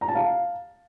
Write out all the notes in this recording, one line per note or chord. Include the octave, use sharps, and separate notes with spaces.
A#5
A5
F5